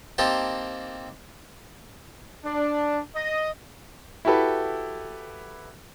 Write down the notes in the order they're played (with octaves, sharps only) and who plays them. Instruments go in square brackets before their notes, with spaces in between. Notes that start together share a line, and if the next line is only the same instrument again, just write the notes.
[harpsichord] A#3 C4 D#4 G4 A5
[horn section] D4
D#5
[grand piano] E4 F#4 G4 A4 B4